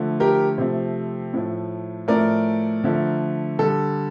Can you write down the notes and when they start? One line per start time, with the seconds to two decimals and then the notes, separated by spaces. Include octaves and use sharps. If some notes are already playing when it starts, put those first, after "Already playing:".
Already playing: D3 F3 A3
0.20 G4 A#4
0.58 C3 F3 A3
1.34 A2 F3 A3
2.08 A2 F3 A3 A#4 D5
2.84 D3 F3 A3
3.59 D3 G3 A4